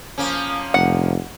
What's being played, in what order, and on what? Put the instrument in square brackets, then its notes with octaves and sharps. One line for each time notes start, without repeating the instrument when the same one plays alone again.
[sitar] F3 A#3 C#4
[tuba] F1 [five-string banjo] F#5